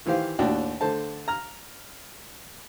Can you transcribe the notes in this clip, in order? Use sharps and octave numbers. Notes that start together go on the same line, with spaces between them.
D#3 E3 G4 C5 F5
D#2 A2 D4 F#4 G5 A5
D3 A3 C5 A5
A#5 F6